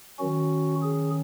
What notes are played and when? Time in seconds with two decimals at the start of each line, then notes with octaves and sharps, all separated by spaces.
0.19 D#3 F#3 C#4 F#4
0.82 G#4